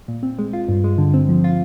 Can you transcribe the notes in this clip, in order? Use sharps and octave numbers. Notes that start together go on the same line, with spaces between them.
A#2
C4
G#3
F4
G2
G#3
D3
C4
F3
F4